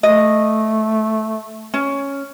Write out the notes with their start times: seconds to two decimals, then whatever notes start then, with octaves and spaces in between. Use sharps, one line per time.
0.03 A3 D#5
1.74 C#4